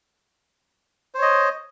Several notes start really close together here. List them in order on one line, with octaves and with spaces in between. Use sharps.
C5 C#5 D#5